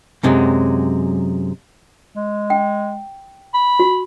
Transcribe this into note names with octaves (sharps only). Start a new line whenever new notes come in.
F#2 C3 F#3 G#3
G#3
G5
B5
F#4